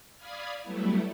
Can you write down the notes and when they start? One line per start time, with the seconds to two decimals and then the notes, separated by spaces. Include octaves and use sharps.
0.17 D5 F5 B5 D#6 F6 G#6
0.63 F#3 G3 A3 B3 E4